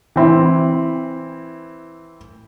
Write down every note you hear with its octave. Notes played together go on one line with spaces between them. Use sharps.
E3 C4 E4